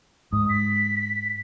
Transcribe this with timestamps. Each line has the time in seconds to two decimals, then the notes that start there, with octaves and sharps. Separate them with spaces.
0.33 G#2 D#6
0.49 B6